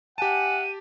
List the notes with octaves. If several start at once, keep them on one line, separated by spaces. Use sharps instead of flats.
G4 E5 F#5 G#5 A5 D#7